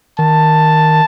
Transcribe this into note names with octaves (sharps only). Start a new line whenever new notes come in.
D#3 A5